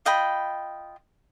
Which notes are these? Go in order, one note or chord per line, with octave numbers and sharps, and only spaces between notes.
F4 D#5 G5 B5